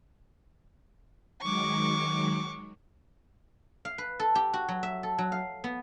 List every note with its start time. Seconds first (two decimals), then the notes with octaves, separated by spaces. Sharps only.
1.41 D#3 F#3 G#3 C#6 D6
3.85 F5
3.98 B4
4.20 A4
4.35 G4
4.53 F#4
4.68 F#3
4.83 E5
5.03 A4
5.18 F#3
5.32 F5
5.64 B3